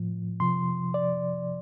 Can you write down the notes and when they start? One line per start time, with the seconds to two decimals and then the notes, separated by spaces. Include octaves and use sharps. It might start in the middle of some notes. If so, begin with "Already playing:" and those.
Already playing: A2 F3
0.40 C3 F3 C6
0.94 D5